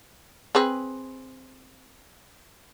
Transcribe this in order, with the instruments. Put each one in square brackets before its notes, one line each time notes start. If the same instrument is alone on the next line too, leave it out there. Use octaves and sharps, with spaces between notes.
[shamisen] C4 G#4 B4